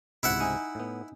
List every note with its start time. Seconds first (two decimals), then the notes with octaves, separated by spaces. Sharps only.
0.23 C#2 G#2 C3 E4 E5 F#5
0.40 D#4 G#5
0.75 A2 B3